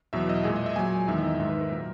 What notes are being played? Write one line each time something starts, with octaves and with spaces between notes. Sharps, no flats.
E2 B2 F#3 E5
D#5
A#2 G#3 G#4
D#5
E5
A#2 F#3 G#5
E2 D#3 G#3 E5
D#5
D#5
G#2 D#3 G#3 E5
B4
A#4
A#2 F#3